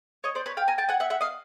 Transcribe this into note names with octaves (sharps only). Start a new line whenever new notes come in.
C#5 D#5
C5 D5
B4 C#5
F5 G5
G#5 A#5
G5 A5
F#5 G#5
E5 F#5
E5 F#5
D#5 F5